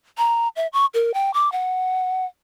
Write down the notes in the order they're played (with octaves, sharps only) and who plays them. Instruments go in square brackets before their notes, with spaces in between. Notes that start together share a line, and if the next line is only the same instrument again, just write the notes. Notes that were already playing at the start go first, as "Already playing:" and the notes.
[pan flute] A#5
E5
C#6
A#4
G5
D6
F#5